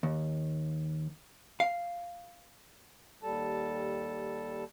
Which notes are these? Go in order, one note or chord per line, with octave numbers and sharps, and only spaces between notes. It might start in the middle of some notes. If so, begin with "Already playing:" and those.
D#2
F5
D#2 G3 A4 A5